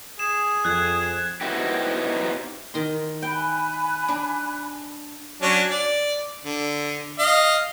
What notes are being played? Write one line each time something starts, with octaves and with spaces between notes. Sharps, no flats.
G#4 E7
F2 F#6 G#6
B3 C4 D#4 E4 F#4 G4
D#3 C6
G5 G#5 B5 F#6
D4
F#3 C#4 D4
D5
D3
D#5 F5